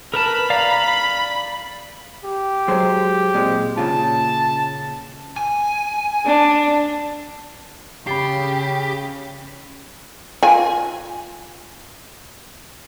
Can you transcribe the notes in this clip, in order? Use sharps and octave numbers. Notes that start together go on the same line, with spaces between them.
A#4 B4 A5 B5
D5 F5 A#5
G4
F#3 G#3 C5
A#2 G#3 C4
A#2 C#3 F4 A5
G#5
D4
C#3 G4 B5 A6 C7
F4 G#5